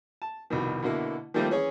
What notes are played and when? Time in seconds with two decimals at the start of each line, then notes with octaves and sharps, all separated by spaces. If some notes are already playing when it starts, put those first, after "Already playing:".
0.22 A5
0.50 C2 F2 B2 D#3
0.82 B2 D3 A#3 E4
1.34 D#3 F3 G3 A3 A#3 C4
1.50 E3 C#4 G#4 C#5